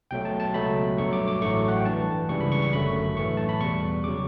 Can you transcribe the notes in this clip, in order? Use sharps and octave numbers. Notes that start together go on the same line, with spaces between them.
B1 B2 F#3 A3 G5
A5
A5
C#2 B2 F#3 A3 B5
G2 F#3 A3 C#6
D6
D6
A1 A2 F#3 A3 C#6
F#5
G5
G2 E3 G3 A5
C#2 C#3 E3 G3 C#6
B5
C#6
C#6
G1 F#2 D3 F#3 A3 B5
B1 A2 E3 A3 C#6
A5
B5
E2 B2 G3 C#6
C#3 F#3 D6